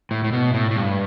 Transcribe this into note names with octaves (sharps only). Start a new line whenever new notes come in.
A2
A2
B2
A2
A2
G2